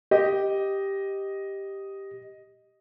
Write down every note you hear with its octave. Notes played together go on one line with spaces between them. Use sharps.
G4 D#5